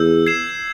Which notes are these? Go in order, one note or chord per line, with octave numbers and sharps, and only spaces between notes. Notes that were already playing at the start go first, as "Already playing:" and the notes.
Already playing: E2 E6 G6
G#6 C7 E7